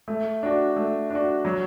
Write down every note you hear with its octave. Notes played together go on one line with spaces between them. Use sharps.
A3
D4 F#4
A3
D4 F#4
F#3